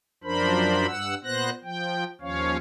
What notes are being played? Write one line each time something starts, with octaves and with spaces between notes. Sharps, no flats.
F#2 F3 D4 A#4 C5 B5
G2 F#5 E6
A#2 B3 C5 F#6 A#6
F3 G5
D#2 F3 C#4 C#5 F5